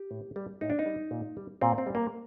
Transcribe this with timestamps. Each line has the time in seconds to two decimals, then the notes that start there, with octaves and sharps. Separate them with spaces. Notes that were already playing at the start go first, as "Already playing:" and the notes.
Already playing: G4
0.11 A2
0.36 G3
0.61 A2 D#4
0.70 D4
0.79 D#4
0.86 G3
1.11 A#2
1.37 G3
1.61 A#2 C4
1.78 C4
1.87 G3
1.95 A#3